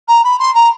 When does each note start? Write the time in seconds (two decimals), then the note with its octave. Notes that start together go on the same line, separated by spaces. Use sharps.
0.08 A#5
0.24 B5
0.39 C6
0.55 A#5